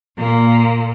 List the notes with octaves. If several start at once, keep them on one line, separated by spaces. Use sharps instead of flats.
A#2 A#3